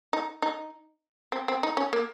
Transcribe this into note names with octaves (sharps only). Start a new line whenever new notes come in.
D#4
D#4
C4
C4
D#4
C#4
A#3